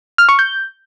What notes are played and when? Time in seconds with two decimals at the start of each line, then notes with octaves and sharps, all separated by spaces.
0.18 F6
0.29 C#6
0.39 G6